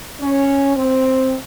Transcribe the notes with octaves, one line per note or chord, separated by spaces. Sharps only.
C#4
C4